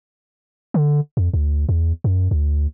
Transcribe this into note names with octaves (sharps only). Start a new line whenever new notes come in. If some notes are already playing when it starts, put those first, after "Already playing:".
D3
F2
D2
E2
F#2
D2